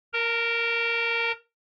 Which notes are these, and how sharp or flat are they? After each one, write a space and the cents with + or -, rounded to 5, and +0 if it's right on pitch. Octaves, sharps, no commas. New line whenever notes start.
A#4 +0 A#5 -45